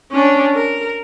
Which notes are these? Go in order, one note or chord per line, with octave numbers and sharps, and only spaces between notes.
C#4 D4
A#4